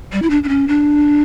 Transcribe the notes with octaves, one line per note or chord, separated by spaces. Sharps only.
G3
E4
D4
D4
C#4
D4